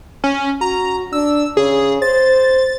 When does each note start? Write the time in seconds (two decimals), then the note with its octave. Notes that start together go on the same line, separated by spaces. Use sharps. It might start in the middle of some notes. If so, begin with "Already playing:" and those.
0.24 C#4
0.61 F#4 A#5
1.13 D4 E6
1.57 C#3 G#4
2.02 C5 A6